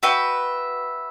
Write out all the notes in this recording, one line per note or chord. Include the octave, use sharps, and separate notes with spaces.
F#4 B4 E5 G5